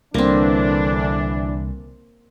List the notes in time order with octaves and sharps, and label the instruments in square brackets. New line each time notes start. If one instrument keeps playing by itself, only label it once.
[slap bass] C2 [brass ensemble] D3 E3 D4 [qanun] A#3 C4